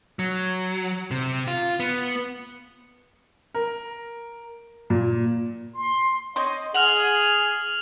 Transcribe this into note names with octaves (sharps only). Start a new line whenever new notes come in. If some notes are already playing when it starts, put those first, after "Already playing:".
F#3
C3
F4
B3
A#4
A#2
C6
C4 C#5 D#5 C6
G#4 F#5 F6 F7 F#7